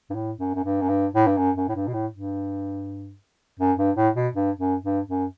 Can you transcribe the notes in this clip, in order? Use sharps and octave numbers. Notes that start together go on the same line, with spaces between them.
G2
A2
F#2
F#2
G2
F#2
G2
A2
G2
F#2
F#2
A2
G2
B2
A2
G2
F#2
G2
A2
B2
G2
F#2
G2
F#2